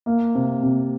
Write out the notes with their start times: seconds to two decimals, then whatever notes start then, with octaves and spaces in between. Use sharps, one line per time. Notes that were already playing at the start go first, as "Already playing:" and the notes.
0.06 A#3
0.35 C3
0.63 C3